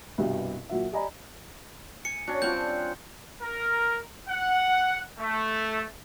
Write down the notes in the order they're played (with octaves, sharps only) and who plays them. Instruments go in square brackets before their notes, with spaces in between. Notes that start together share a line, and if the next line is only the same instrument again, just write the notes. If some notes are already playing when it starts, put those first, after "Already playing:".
[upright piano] C2 G2 B2 G4
A#2 F#3 F#4 E5
G4 D5 D#5 G#5 A#5 B5
[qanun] G#5 [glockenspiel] C#7
[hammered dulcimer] C#4 D4 [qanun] F#4
[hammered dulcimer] G3 [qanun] C4 D4 F4 [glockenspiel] G6
[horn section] A#4
F#5
A3